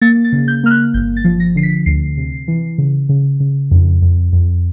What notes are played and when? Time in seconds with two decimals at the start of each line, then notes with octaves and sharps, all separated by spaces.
0.01 A#3 A6
0.24 A6
0.32 C#3
0.48 G6
0.64 A#3 F6
0.71 F#6
0.94 G1 G6
1.17 A6
1.24 F3
1.40 A#6
1.55 D3 C7
1.63 B6
1.86 D2 C7
2.17 C3
2.48 E3
2.78 C#3
3.09 C#3
3.40 C#3
3.71 F2
4.02 F2
4.33 F2